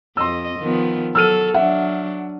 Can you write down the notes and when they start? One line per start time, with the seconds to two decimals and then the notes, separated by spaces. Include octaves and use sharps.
0.17 F2 D#5 C6 E6
0.60 D#3 F3 B3
1.15 F#3 A4 E6 F6 D#7
1.54 F#3 D4 E5 F#5